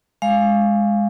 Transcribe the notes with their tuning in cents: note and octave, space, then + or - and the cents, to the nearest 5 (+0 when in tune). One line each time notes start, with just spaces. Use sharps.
G#3 +0 F5 +0